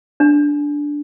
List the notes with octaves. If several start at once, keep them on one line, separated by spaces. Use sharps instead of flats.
D4